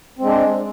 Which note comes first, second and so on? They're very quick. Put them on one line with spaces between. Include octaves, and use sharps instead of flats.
C4 G#3 D4